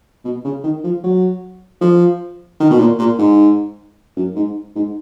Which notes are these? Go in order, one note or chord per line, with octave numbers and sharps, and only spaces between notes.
B2
C#3
D#3
F3
F#3
F3
D#3
B2
A#2
A#2
G#2
F#2
G#2
G#2